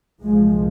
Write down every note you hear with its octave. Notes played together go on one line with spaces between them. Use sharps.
C2 A#2 F3 G#3